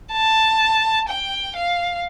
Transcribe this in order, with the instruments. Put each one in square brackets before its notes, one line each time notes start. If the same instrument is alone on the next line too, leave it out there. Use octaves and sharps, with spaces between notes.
[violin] A5
G5
F5